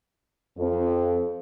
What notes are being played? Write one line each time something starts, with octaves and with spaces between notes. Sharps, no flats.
F2